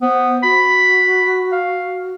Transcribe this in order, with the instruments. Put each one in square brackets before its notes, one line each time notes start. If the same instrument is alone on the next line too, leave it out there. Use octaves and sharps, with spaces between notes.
[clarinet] B3 [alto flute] C5
[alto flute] F#4 [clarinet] B5
[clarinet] F5